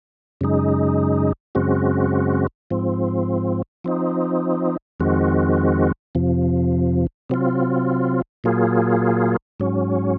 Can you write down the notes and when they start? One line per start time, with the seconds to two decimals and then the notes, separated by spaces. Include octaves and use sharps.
0.41 F#2 C#3 G#3 D#4
1.55 F#2 C#3 G#3 C4 F#4
2.71 G#2 F3 C4
3.84 F3 C4 D#4
5.00 F2 D#3 G#3 C4 F#4
6.15 F2 C3 F3
7.30 C3 F#3 C4 F4
8.44 A#2 F#3 A#3 F4 G#4
9.60 G#2 F#3 C#4